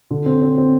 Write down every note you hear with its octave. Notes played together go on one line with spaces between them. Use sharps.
D3
C4
C4
C4